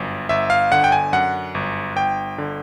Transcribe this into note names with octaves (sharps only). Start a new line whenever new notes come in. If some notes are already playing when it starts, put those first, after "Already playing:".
Already playing: G1 F#2
G1 E5
F5
D3 F#5
G5
G#5
F#2 F#5
G1
G1 G5
D3